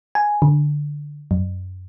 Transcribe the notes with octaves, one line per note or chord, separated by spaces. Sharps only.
G#5
D3
F#2